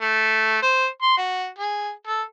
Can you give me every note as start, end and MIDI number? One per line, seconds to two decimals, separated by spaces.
0.01 0.61 57
0.62 0.87 72
1.02 1.16 84
1.17 1.47 66
1.58 1.90 68
2.07 2.22 69